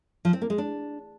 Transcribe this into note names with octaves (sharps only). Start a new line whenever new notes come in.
F3
C4
A#3
G#3
D4